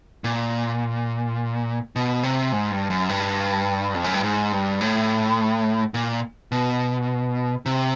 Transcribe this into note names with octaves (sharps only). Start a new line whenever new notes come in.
A#2
B2
C3
G#2
G2
F#2
G2
F2
F#2
G2
G#2
G2
A2
A#2
B2
C3